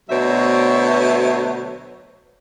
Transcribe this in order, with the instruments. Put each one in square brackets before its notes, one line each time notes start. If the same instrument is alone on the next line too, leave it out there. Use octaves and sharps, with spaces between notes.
[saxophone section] D2 B2 F#3 C5 C#5 E5